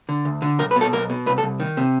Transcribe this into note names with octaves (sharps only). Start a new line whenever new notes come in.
D3
D2
D3
B1 A#4
B4
B2 A4
B1 A#4
B2
C2 B4
A4
C2
D#3
C3